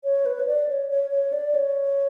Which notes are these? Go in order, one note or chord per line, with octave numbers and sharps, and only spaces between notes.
C#5
B4
C#5
D5
C#5
C#5
C#5
D5
C#5